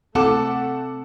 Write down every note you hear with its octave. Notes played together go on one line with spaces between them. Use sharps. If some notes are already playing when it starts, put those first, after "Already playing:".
A3 C4 A4 F#5 A5 D6